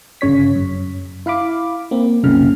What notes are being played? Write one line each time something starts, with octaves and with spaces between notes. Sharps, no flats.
G1 C#3 C#5 B6
F#2
E4 F5 B5 D6
A#3 C4
C2 F#2 A#2 C#3 F6